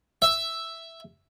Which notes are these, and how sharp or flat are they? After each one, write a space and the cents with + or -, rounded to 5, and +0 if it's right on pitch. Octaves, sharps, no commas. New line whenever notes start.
E5 +0